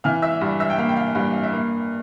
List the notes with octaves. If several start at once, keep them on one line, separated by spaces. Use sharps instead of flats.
E3 F5 F6
E5 E6
G2
E5 E6
G5
A#3 F5
G5
F5
G2 F5
F5
E5
A#3